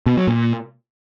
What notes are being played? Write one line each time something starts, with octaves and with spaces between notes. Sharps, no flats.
B2
F#3
A#2